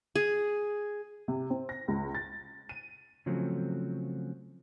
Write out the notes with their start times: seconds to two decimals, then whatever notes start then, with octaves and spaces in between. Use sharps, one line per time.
0.16 G#4
1.28 C3
1.50 C4
1.69 A#6
1.88 C#2
2.15 A6
2.69 D#7
3.26 C#3 F3 F#3 A3 C4